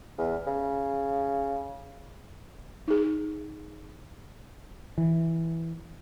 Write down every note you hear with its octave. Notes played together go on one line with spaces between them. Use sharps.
E2
C#3
D#4 G#4
E3